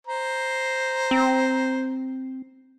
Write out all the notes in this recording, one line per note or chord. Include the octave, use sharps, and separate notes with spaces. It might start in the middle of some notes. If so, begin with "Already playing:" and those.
C5 A#5
C4